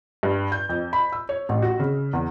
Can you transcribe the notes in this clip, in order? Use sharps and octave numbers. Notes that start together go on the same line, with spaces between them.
G2
G6
F2
B5
E6
C#5
A1
F#4
C#3
E2